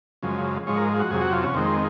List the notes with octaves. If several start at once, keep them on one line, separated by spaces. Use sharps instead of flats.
F#2 C#3 F3 G#3
G#2 F3 G#3 C#5
A#4
F#4
F2 C3 F#3 G#4
F#4
F4
C#4
F2 D#3 G#3 C4